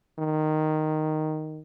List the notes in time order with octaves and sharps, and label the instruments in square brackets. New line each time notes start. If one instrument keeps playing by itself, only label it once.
[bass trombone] D#3